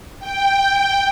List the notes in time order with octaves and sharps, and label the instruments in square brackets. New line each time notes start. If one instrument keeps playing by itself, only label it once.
[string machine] G5